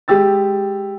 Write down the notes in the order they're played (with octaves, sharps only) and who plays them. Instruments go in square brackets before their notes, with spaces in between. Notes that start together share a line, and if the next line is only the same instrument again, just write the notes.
[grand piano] G#3 G4 E6 A6